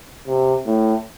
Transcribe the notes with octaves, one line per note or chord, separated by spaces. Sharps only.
C3
A2